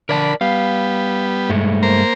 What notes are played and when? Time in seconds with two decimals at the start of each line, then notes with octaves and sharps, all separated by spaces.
0.09 D3 A#4 D5 A5 B5
0.41 G3 B3 F5
1.49 G2 G#3 A3
1.83 A#3 C5 A#5